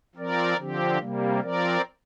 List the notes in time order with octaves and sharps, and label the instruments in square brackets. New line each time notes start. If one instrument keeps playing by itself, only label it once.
[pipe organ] F3 C4 A#4 D5
D3 F3 C4 G4
C3 G3 A#3
F3 C4 A#4 D5